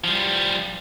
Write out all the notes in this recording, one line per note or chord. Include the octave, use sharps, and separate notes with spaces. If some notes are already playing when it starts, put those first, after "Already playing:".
F3 G3